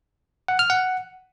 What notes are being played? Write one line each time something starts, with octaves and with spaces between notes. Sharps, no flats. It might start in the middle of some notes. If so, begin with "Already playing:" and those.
F#5
F6
F#5